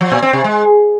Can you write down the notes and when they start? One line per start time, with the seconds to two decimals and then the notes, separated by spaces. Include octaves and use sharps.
0.01 F3
0.12 A#2
0.22 C4
0.33 C3
0.44 G#3